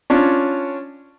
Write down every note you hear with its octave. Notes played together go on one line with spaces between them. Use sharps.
C#4 D4 F4 C#5